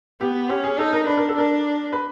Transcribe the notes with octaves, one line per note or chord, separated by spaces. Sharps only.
B3 G4
C#4 G4
G#4
D#4 A4
A#4
D4 B4
A#4
A4
D4 A#4
B4